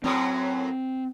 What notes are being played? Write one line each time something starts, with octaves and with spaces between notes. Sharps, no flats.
F#2 A2 F#3 C4